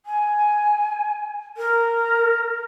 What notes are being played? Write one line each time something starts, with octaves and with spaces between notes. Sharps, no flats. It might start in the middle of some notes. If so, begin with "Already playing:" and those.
G#5
A#4